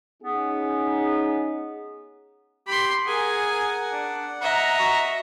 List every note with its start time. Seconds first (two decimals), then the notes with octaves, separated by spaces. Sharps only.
0.23 B3 C#4 D#4 G#4
2.67 G4 B5 C6
3.06 G#4 A#4 F#5 G#5
3.92 D4
4.41 D#5 E5 F#5 A#5
4.79 F#4